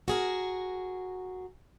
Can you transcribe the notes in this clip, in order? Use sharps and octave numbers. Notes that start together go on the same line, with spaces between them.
F#4 G#4 A#4